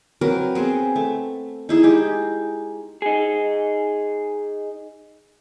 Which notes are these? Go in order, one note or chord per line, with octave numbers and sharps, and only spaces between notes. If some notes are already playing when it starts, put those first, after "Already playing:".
F#3 C4 A#4 B4
B3 C4 G#4
A3
D#4 E4 G#4
G#3 D#4 G4
D#4 G#4